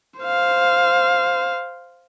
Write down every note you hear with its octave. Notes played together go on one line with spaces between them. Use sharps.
C5 F5